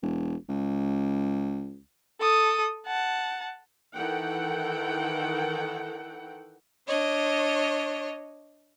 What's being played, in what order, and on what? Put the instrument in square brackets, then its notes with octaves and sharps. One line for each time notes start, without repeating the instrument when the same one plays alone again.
[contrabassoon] E1
C#2
[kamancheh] A4 D#6
F#5 A5
[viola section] D#3 E3 A4 F#5 G5
[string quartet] D4 C#5 D#5